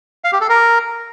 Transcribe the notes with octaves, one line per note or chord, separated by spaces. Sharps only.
F5
G4
A4
A#4